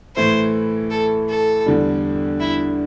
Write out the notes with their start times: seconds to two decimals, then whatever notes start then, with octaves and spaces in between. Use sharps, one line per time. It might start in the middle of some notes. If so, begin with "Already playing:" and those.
0.16 A2 E3 A3 E4 C5
0.91 A4
1.29 A4
1.66 E2 D3 G3
2.40 E4